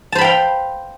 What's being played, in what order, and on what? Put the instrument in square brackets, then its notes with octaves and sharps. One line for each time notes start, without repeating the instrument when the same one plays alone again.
[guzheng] A5
C5
B5
G5
F5